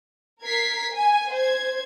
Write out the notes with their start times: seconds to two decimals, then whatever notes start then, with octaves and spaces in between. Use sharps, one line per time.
0.43 A#4 G#6 B6 C7
0.93 G#5
1.32 C5 G#6